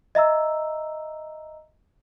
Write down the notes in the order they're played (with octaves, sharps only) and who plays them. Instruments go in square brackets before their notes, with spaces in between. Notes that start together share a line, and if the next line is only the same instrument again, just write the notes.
[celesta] D#5 E5 A#5 E6